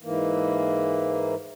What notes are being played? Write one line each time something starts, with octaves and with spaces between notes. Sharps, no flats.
G#2 E3 A#3